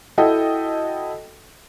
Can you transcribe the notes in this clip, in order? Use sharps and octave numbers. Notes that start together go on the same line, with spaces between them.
E4 F#4 A4 D#5 G5